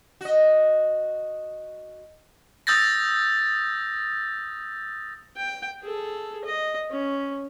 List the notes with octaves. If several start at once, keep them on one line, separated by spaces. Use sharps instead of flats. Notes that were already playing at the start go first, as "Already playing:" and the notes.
F#4 D#5
D#6 E6 G6 A6 A#6
G5
G#4 A4
D#5
C#4